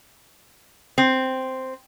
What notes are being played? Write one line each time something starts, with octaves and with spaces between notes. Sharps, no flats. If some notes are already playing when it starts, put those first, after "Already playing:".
C4